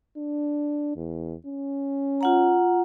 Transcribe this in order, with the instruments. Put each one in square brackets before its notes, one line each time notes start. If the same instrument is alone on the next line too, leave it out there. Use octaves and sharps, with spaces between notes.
[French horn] D4
E2
C#4
[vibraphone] F4 F#5 A#5